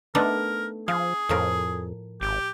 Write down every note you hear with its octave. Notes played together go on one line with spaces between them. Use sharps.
A3 B3 D4 D#4 A#4
F3 G#4 F5
F2 A2 F3 A#4
G#1 G4